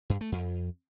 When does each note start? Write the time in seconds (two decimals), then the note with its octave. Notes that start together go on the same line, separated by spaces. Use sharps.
0.10 G2
0.21 A3
0.32 F2